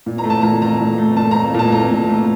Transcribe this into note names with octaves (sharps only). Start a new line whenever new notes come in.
A#2
A#5
A3
A5
A#2 A#5
A3 A#5
A#2
A3
A#2 A5
A3 A#5
A#2 A5
A3 A#5
A#2
A3